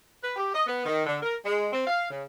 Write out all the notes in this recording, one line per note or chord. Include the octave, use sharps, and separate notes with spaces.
B4
G4
D#5
B3
D#3
D3
A#4
G#3
C4
F5
C#3